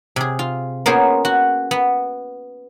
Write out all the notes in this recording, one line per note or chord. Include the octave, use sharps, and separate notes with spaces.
C3 G#4
F4
A#3 B3 C#4 F4 G#4 C5
F#4
B3